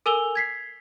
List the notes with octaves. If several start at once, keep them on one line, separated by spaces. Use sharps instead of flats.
A4 A#4 G#5 E6 F7 G7
G#6 B6 C7